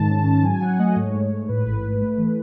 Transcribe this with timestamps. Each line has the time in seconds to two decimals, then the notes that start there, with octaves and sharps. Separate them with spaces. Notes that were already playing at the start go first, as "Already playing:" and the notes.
Already playing: G#2 D#3 A5
0.09 C#4
0.26 G#2
0.43 F#3 G#5
0.61 F#3 F#5
0.79 A3 D#5
0.96 G#2 C#5
1.14 G#2
1.31 G#2
1.48 A2 B4
1.66 A1
1.83 A1
2.01 A3
2.18 E3